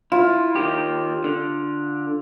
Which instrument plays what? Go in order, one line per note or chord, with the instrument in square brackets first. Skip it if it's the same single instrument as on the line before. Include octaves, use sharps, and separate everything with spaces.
[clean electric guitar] E4 [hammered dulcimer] F4
[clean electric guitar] D#3 G4
D3